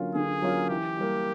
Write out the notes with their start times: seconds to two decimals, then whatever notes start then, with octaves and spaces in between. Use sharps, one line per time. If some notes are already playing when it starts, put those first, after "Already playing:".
Already playing: D3 F#3 A#3 C#4 F4
0.15 D3 G#4
0.42 F#3 A#3 C#4 F4
0.70 E3 G4
0.97 G3 A#3